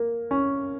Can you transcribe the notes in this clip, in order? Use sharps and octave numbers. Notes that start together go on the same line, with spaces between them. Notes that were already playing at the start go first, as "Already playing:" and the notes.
Already playing: A#3
C#4